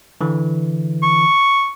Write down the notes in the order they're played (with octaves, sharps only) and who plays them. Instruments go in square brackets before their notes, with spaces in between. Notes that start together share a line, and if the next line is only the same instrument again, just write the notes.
[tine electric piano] D3 E3
[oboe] C#6